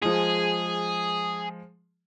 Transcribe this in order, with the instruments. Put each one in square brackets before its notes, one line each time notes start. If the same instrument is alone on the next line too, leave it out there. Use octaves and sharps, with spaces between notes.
[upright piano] F3 G#3 [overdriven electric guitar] G#4